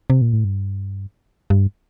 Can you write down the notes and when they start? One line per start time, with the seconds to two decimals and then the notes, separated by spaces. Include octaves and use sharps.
0.10 C3
0.22 A#2
0.33 A2
0.44 G2
1.50 G2